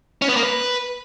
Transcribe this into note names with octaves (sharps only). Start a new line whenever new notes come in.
C#4
B3
A#3
B4